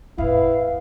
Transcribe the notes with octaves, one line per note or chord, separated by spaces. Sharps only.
E2 A2 B3 E4 F5